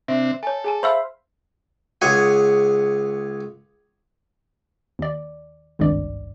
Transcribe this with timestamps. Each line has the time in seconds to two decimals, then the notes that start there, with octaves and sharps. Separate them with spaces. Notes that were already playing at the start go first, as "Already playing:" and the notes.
0.08 C3 C4 D4 E5
0.43 A4 C#5 G#5
0.64 G#4 G#5 A5
0.83 C5 E5 F5 B5 C6 E6
2.01 C#2 G#4 C#5 F#5 G#5
4.99 D#2 D5
5.79 G#1 C#2 G2 D5